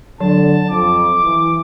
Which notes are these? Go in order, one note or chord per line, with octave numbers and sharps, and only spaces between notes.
D3 F#3 A5
F2 D6
E3